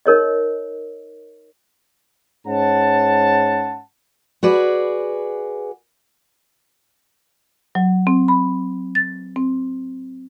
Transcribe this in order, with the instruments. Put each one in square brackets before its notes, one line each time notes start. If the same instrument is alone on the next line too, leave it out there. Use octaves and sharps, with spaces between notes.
[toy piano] D#4 A#4 C#5 D#5
[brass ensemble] G#2 C#4 F#5 A5
[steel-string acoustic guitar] F#4 G#4 B4 D5
[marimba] F#3
C4
B5
A6
C4